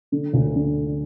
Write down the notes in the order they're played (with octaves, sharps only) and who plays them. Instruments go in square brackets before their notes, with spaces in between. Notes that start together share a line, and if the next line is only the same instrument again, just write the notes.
[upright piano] D3
D2
D3